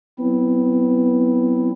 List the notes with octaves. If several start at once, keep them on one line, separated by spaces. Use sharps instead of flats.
F#3 B3 C4 E4